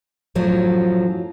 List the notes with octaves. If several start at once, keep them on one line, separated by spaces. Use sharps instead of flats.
F#2 A2 F3 F#3